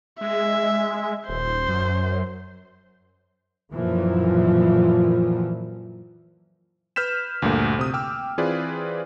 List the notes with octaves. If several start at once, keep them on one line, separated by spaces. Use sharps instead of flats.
G#3 E5
D#1 C5
F#2
F#2 A#2 E3 F3
B4 F6 G6 B6 E7
D2 G2 A#2 A3 A#3
C3 D#6
G5 D6 E6 F6
E3 C4 F4 G#4 B4 D5